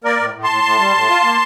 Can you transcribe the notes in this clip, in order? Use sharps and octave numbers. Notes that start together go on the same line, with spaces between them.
A#3 A#4 D5
A2
A2
A5 C6
A2
A2
G3
A2
F4
A#3